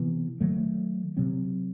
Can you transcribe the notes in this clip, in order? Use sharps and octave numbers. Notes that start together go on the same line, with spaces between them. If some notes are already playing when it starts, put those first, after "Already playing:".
Already playing: C3 E3 B3
D#3 F#3 A3
C3 F#3 C4